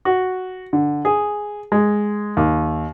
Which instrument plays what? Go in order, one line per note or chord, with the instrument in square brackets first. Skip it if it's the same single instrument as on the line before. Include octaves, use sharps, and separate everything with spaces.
[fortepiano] F#4
D3
G#4
G#3
D#2